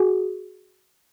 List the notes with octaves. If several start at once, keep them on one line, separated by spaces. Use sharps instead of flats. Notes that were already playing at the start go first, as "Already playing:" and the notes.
Already playing: F#4 G#4